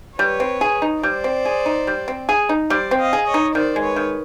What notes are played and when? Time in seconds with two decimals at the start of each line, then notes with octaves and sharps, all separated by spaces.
0.18 G3 B4 C#5
0.40 C4
0.61 G#4
0.82 D#4
1.03 G3 C5 D5
1.24 C4
1.45 G#4
1.66 D#4
1.87 G3
2.08 C4
2.29 G#4
2.49 D#4
2.70 G3 C5 D5
2.91 C4
2.99 D#5 F5
3.13 G#4
3.27 C#5 D#5
3.34 D#4
3.55 D#3 C5 D5
3.76 G#3
3.83 B4 C#5
3.96 D#3